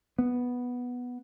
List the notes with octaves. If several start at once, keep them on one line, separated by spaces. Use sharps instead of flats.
B3